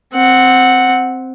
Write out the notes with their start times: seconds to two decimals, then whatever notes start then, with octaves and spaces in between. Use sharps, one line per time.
0.13 C4 F#5